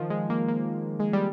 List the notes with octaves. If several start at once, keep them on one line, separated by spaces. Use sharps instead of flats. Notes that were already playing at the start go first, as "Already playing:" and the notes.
Already playing: D#3 F3
G#3
A#3
A#3
G#3
G3